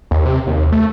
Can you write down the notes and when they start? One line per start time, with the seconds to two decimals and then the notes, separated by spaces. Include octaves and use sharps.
0.11 D#2
0.26 C3
0.47 D#2
0.72 A3